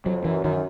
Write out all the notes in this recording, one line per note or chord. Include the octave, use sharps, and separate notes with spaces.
F2 F#3
F#2 E3
F#2 D#3